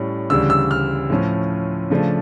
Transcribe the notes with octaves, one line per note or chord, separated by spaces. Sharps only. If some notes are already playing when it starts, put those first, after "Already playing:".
Already playing: A2 G3 C#4
D2 C#3 E3 G3 D4 E6
E6
F6
A2 F3 C#4
C#3 F3 A3 D4